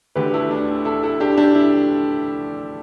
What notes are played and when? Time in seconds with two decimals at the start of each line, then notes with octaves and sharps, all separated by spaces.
0.16 D2 D3 G4 B4
0.34 E4 A4
0.51 D4
0.85 E4 A4
1.03 E4 A4
1.20 D4 G4
1.37 D4 G4
1.55 E4